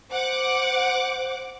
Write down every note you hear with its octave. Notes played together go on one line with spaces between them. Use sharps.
C5 F#5 D6